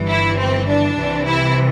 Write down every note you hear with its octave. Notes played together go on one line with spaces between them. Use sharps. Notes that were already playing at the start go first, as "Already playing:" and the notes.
Already playing: G1 G2 E3
E4
C4
D4
C2 C3 E3
E4